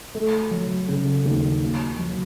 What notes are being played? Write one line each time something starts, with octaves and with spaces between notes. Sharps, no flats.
A3
F#3
C#3
D#2
A#3
F#3